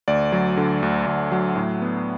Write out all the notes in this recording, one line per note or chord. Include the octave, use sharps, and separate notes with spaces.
D2 D5
F#3
D3
D2
D2
F#3
A2
B3